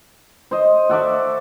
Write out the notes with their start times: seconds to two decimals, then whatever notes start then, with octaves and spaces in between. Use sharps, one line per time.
0.51 C5 D#5
0.90 F#4 A4 D5 E5